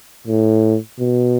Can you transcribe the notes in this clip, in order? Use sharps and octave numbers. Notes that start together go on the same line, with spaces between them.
A2
B2